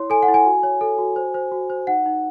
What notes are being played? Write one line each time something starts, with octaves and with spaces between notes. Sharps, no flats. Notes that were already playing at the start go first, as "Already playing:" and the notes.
Already playing: E4 C#5 C6
A4 G#5
F#5
E4
G#5
F#4
C#5
A4
F#4
C5
C5
F#4
C5
D#4 F#5
D#4